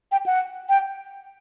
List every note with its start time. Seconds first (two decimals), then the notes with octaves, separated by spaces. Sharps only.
0.12 G5
0.26 F#5
0.69 G5